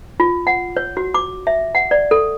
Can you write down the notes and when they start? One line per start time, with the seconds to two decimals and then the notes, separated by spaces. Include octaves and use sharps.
0.20 F4
0.47 F#5
0.77 C#5
0.97 F#4
1.14 D6
1.47 E5
1.75 F#5
1.91 D5
2.11 A4